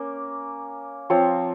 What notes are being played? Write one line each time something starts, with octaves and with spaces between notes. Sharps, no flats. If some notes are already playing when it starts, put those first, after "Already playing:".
Already playing: A#3 C#4
F3 C4 F4 C#5